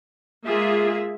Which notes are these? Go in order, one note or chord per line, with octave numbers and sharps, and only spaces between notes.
G#3 A#3 F4 G#4 E5